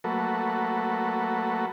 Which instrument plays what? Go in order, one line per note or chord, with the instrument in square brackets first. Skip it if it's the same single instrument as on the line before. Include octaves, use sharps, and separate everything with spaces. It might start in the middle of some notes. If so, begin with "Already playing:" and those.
[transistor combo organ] F#3 A3 A#3 F#4 A4 B4